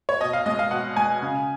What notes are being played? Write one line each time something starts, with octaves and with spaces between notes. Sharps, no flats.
C#5
B2 D#5
F5
G#3 D#5
F5
B2 F#5
G#3 G#5
C#3